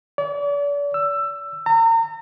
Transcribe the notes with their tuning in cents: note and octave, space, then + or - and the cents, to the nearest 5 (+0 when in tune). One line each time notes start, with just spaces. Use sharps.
D5 -40
E6 +15
A#5 -35